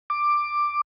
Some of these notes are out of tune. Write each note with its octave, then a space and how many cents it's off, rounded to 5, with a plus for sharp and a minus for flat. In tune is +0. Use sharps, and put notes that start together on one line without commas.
D6 +10